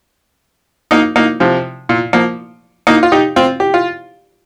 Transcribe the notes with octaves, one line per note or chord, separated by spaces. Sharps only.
A#3 D#4
A#3 D#4
C3 F3
A#2
F3 A#3
A#3 D#4
F4
D#4 G4
C4 F4
G4
F4